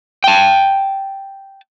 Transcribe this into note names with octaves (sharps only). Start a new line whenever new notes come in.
G5 A5